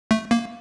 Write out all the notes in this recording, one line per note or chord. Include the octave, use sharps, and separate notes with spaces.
A3
A#3